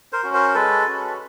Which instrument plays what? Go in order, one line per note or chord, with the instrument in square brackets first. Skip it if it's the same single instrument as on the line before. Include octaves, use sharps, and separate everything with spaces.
[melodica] A#4 C5
C#4 F#4
A#4 C5
G#3 A4 B4
C#4 F#4